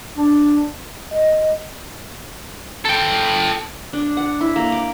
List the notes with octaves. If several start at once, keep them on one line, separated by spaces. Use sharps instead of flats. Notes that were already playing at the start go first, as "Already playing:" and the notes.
D4
D#5
A4 G5
D4
F#5
E4
A#3
D6